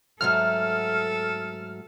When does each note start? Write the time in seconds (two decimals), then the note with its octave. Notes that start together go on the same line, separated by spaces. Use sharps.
0.21 G#2 F#3 A3 A4 F6